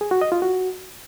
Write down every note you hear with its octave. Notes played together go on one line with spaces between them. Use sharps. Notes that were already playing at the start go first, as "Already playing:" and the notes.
G#4
F#4
D#5
F4
F#4